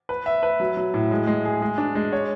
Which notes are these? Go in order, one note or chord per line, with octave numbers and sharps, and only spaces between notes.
B4
E5
B4
F#3
F#3
A2
G#3
G#3
G#4
G#3
D4
G#3
C#5